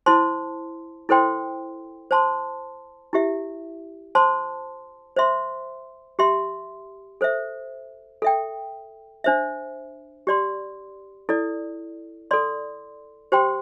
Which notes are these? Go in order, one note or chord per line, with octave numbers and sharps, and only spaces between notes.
E4 C5 A5 C6
E4 A4 C5 G5 C6
C5 A5 C6
E4 G4 E5
C5 A5 C6
C5 E5 C6
G4 E5 C6
A4 C5 E5
A4 E5 G5
D4 C5 E5
G4 D5 C6
E4 A4 D5
A4 D5 C6
G4 C5 G5 C6